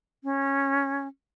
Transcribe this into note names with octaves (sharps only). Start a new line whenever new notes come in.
C#4